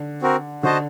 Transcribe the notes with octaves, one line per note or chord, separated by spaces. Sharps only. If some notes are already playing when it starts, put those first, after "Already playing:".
Already playing: D3
C4 F#4 A#4
D3 F#4 C5 D#5 A5